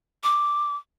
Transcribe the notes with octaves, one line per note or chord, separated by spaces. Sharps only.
D6